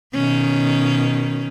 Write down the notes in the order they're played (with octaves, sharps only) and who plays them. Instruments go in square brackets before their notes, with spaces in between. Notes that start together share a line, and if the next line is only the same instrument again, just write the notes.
[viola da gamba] B2 D#3 C#4